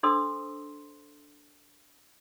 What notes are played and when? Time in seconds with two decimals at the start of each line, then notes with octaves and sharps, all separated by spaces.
0.03 D4 A4 C5 C6 D#6 E6